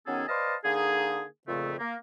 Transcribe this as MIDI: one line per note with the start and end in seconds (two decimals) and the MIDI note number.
0.06 0.23 51
0.06 0.23 54
0.06 0.23 59
0.06 0.23 61
0.06 0.23 68
0.06 0.23 69
0.28 0.55 71
0.28 0.55 72
0.28 0.55 74
0.28 0.55 75
0.28 0.55 77
0.28 0.55 81
0.63 1.24 50
0.63 1.24 58
0.63 1.24 63
0.63 1.24 68
1.47 1.74 41
1.47 1.74 46
1.47 1.74 49
1.47 1.74 57
1.79 1.95 58